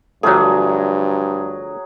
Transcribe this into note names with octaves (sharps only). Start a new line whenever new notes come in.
G2 D3 F3 F#3 A3 G#4